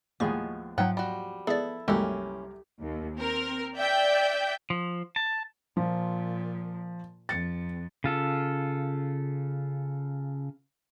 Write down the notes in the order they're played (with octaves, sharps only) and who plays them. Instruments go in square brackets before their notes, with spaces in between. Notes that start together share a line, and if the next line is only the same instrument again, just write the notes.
[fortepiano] D#2 A2 G#3 [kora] F3 B3 G#4 [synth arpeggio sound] C#6
[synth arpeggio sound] G#2 F#3 [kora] F3 [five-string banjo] F#5 G5
[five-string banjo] G3 F#4
[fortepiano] B3 [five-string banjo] E4 [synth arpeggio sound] G#4 D5 [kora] A4
[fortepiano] C2 F#2 A#3 [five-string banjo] E3 C#4 [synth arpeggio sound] G#3 A4 [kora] G4
[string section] D#2
C4 A#4
D5 E5 G5 G6
[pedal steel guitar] F3
A5
[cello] A#2 [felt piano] F3
[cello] F2 [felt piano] A6 C#7
[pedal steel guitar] C#3 F4 A4